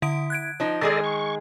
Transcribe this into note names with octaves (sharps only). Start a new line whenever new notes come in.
D3 E4 D#6 D7
F#6 G#6 D7
F3 D#4
D#3 G#3 G#4 A4 D5 D#5
C#6